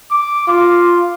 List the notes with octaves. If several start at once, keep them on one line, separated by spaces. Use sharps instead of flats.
D6
F4